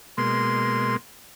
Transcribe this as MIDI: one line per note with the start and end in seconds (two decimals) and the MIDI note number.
0.18 0.97 47
0.18 0.97 56
0.18 0.97 58
0.18 0.95 84